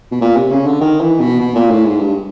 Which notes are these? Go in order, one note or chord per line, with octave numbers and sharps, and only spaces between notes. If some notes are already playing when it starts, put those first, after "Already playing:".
B2
A#2
C3
C#3
D3
D#3
E3
B2
B2
A#2
A2
G#2
G2